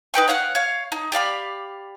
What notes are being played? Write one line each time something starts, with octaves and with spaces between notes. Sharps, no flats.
D#4 B4 G5 C#6
C#5 F5 F#5 F#6
C#5 F5
D#4
G4 D5 F5 B5